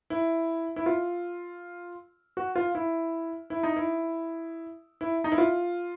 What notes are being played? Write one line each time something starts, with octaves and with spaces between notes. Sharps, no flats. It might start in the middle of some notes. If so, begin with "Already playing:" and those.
E4
E4
F4
F#4
F4
E4
E4
D#4
E4
E4
D#4
E4
F4